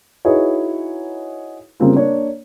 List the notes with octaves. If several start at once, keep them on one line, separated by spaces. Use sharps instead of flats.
D#4 E4 F#4 G#4 B4 C#5
C#3 G3 A#3 C4 C#4 F4
A#3 D4 C#5